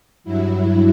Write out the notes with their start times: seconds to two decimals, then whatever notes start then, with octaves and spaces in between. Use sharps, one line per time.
0.24 G2 F#3 E4